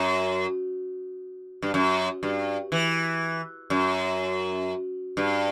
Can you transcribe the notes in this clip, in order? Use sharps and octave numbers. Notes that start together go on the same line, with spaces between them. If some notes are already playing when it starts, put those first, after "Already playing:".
Already playing: F#2
G2
F#2
G2
E3
F#2
G2